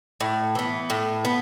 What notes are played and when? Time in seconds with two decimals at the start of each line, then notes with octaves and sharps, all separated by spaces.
0.20 A2
0.55 E3 B3
0.90 A2
1.25 B3